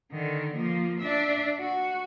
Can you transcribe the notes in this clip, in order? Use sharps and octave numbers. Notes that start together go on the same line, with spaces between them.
D3 D#3
F3 A#3
D4 E5
F#4